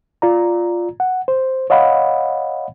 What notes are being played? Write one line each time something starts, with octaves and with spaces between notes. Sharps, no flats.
F4 D5 A#5
F#5
C5
C#5 D#5 F5 F#5 B5